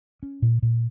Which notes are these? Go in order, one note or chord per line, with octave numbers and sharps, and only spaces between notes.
C#4
A#2
A#2